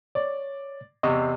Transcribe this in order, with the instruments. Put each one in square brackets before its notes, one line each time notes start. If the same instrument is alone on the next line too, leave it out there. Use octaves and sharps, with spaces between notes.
[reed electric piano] C#5 [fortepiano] D5
[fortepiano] E2 C3 C#6 [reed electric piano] D#5